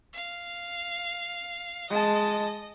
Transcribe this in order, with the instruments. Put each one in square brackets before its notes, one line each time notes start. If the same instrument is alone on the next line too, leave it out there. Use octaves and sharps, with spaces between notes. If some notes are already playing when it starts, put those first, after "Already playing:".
[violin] F5
[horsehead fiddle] G#3 A5 [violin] D#5